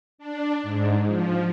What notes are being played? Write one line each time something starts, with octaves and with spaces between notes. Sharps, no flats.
D4
G#2
F3